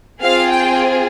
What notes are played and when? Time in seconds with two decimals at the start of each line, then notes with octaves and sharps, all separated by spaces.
0.21 C4 F4 G#4 F5
0.50 G5